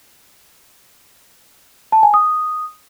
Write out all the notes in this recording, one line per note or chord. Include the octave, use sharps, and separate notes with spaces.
A5
G#5
D#6